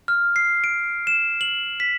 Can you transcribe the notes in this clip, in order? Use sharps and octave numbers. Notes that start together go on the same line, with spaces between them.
F6
C7
D7
E7
F#7
B6